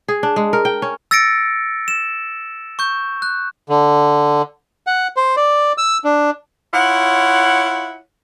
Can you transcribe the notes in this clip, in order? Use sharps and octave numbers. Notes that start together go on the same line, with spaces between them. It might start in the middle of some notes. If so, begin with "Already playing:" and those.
G#4
D4
G#3
A#4
G5
C#4
E6 A6 A#6 C#7 D7
E7
C#6 G6
F#6
D3
F#5
C5
D5
E6
D4
E4 F4 C#5 F#5